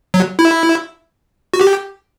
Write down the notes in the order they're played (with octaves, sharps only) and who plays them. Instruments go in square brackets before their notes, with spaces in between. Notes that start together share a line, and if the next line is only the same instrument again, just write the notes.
[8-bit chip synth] F#3
E4
F#4
G4